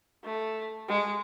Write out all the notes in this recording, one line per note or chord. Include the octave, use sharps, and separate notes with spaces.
A3
G#3